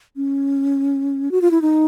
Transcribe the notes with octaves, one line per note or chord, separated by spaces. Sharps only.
C#4
F#4
F4
E4
D#4